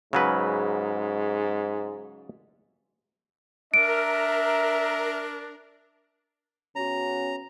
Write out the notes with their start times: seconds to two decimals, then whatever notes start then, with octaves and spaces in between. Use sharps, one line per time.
0.13 G#2 C#3 F#3 B4
3.74 D4 A#4 E5 D7
6.76 C#3 B3 C#4 F#4 A#5